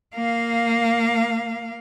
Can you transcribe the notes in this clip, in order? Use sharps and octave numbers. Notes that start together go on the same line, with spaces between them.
A#3 F5